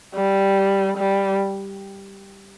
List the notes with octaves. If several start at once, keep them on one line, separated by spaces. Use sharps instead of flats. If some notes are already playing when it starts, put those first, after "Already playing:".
G3
G3